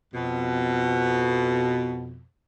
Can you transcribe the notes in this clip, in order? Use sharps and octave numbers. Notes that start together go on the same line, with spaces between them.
F2 B2